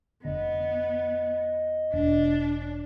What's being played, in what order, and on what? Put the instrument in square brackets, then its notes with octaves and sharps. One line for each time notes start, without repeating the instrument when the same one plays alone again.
[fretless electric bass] F1 D3 [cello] B3 [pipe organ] D#5
[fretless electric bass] E1 [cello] D4